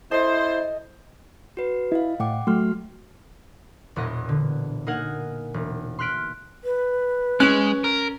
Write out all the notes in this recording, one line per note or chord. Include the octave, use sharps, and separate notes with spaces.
E4 A4 C5 D#5
F#4 B4
E4 D#5 F5
A2 F#5 G5 D6
F#3 A3 F#4 C6 F6
E1 E2 A#2 E3 B3 D#5
D3
A#3 D#4 A#4 D#5 F#5 G#5
E1
C6 F6 F#6 B6 D7
B4
G#3 C#4 F#6
A#4